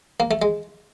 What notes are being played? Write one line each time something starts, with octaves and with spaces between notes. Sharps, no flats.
A#3
A3
G#3